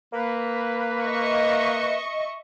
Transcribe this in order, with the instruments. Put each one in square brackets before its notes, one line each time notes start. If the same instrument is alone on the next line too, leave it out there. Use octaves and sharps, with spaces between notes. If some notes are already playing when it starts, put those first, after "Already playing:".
[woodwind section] A#3 B4
[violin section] D#5 E5 C#6